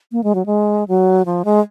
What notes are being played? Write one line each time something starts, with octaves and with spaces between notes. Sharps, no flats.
A#3
G#3
F#3
G#3
F#3
F3
G#3